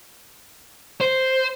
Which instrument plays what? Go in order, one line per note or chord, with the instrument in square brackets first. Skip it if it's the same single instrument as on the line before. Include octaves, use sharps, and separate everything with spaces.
[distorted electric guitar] C5